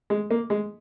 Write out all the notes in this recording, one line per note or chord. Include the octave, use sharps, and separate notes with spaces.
G#3
A#3
G#3